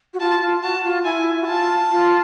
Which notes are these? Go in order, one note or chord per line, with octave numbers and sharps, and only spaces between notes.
F#4
F4 A5
F4
F#4 A5
F4
E4 G#5
F#4
F4 A5
F4